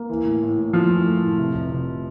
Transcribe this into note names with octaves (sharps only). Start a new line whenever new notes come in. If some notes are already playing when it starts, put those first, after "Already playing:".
Already playing: A#3
E3
A2
A2
A2
F3 A3
E3
A3
A2
C3
F1
C3